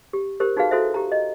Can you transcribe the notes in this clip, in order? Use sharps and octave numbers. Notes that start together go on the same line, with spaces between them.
G4
G4 A#4 C5
D#4 F#4 G#4 B4 F5
E4 F#4 A4 C5 E5
G4 A#5
D#5